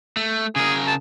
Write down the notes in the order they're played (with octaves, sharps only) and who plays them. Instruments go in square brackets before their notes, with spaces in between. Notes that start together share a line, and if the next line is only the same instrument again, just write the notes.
[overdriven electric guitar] A3
[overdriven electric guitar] C#3 A#4 [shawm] G#4
[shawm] A5